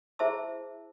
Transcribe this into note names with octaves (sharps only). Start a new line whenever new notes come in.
E4 G#4 C5 E5 A5 E6